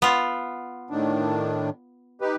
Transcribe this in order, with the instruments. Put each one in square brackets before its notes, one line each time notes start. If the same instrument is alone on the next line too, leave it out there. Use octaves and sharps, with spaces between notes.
[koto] B3 F4
[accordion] A2 D#3 D4
D#4 G4 B4